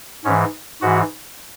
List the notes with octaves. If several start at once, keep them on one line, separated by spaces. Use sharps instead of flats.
G#2 E3 C#4
G#2 E3 F#4